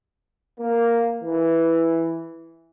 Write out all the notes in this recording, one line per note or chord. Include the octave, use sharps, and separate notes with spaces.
A#3
E3